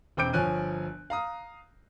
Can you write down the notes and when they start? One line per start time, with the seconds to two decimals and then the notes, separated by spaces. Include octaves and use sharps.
0.17 E1 C4 G5 D6 G6 D7
0.33 G1 F3 C#5 G#5 F#6 D#7
1.10 F5 A#5 D#6